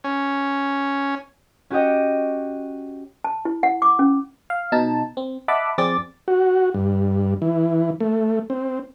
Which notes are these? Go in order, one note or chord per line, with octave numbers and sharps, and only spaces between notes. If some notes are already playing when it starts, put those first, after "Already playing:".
C#4
C#4 F#4 G4 C#5 D#5 G5
A5
E4
F#5
D6
C#4
F5
B2 D#4 A5
C4
D#5 E5 F#5 A5 B5 D6
F2 C4 G#4 D5 D6 A6
F#4
G2
E3
A3
C4